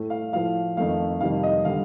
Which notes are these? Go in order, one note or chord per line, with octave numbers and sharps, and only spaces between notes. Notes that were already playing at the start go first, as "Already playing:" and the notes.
Already playing: A2 A3
F5
A2 F3 A3 F5
F2 D#3 A3 F5
F2 C3 D#3 G3 F5
D#5
D3 G3 F5